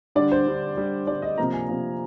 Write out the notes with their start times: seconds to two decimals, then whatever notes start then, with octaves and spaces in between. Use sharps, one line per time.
0.15 D3 G3 D4 D5
0.32 C5
0.47 D3 G3 D4
0.77 D3 G3 D4
1.07 D3 G3 D4 D5
1.22 D#5
1.38 C3 F3 A#3 A#5
1.53 G#5
1.69 C3 F3 A#3